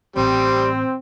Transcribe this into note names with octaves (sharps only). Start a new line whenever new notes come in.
A1 G3 C4 C6